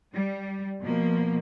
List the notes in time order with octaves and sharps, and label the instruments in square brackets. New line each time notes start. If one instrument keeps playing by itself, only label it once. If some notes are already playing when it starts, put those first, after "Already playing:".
[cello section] G3
B2 F3 A#3